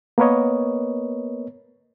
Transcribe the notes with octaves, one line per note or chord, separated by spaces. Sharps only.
A#3 B3 A#4 B4 C#5 D#5